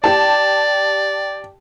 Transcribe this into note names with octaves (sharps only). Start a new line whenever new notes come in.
G4 D5 A5